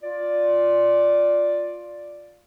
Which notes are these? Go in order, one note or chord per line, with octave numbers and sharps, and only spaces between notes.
F4 D5